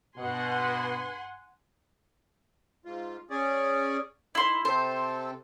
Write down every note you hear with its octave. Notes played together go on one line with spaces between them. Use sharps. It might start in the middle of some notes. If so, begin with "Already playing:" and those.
G2 B2 B4 F#5 G#5 C6
G#2 F4
C#4 G#4 D5
D#3 E4 C6
C3 C4 A4 C5